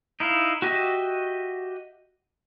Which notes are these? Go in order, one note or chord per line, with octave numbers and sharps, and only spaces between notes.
D#4 E4 F5
F#4 G4 D#5 E5